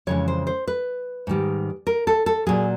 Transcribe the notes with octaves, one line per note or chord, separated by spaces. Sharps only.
F2 C#3 E3 G#3 C#5
C5
C5
B4
G#2 D#3 G3
A#4
A4
A4
A#2 F#3 G#4